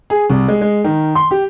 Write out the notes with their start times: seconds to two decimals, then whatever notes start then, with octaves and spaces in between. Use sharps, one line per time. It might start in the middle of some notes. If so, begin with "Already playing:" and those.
0.10 G#4
0.30 C2
0.48 G#3
0.61 G#3
0.84 D#3
1.15 C6
1.31 G4